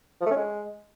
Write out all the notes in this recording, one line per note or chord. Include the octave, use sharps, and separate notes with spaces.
F3
A3
C#4
G#3